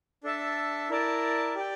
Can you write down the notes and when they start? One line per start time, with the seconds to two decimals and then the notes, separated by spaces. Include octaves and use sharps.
0.24 D4 A4 E5 A5
0.89 E4 A#4 D5 A5
1.55 G4 D5 G5